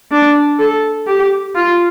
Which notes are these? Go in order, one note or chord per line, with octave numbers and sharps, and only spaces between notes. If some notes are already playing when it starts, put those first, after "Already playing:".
D4
A4
G4
F4